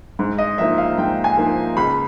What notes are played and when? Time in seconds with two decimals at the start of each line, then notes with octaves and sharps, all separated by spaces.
0.19 G#2
0.38 D#5
0.58 F3 A#3 D#4 E5
0.78 F5
0.97 G#2 G5
1.24 G#5
1.37 F3 A#3 D#4
1.77 C#2 B5